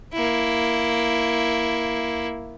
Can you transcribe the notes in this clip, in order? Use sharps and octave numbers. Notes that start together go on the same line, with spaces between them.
A#3 E4